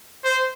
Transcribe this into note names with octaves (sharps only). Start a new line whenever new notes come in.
C5